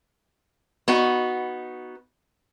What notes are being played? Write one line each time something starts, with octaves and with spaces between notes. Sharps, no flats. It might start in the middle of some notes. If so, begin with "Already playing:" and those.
B3 D#4 F#4